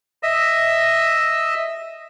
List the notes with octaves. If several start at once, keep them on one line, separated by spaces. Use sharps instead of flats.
D#5 E5